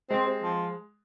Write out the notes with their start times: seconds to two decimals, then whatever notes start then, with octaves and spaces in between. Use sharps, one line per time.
0.10 G#3 C4
0.25 C4
0.41 F3